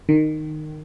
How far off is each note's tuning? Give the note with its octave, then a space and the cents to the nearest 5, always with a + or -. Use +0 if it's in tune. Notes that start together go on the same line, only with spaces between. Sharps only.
D#3 -15